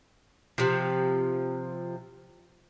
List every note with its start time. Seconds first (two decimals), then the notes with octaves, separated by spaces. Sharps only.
0.58 C3 F3